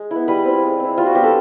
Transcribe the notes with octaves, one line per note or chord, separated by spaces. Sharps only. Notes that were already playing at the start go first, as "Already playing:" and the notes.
Already playing: G#3
B3 E4
G3 B4
C4
F4
G#3
C4 E4
G3 F4
F#4
B3 D4 F4 G4
A4